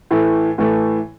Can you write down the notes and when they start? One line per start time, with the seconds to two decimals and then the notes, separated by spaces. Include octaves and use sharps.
0.11 A2 E3 A3
0.58 A2 E3 A3